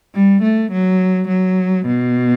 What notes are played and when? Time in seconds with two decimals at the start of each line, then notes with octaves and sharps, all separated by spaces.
0.15 G3
0.43 A3
0.72 F#3
1.28 F#3
1.86 B2